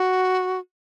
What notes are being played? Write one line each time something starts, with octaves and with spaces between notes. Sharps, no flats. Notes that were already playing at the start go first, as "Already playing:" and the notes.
Already playing: F#4